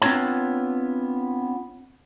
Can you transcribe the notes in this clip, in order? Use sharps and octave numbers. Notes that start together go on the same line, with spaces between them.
B3 C4 D4 F4 C#5 A5